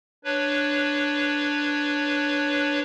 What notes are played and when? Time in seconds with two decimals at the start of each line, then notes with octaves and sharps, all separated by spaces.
0.24 D4 B4 C#5